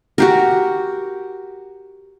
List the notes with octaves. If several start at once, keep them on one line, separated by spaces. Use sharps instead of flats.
F#4 G4 A#4